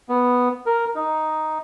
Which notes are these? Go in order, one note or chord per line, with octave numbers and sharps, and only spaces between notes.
B3
A#4
D#4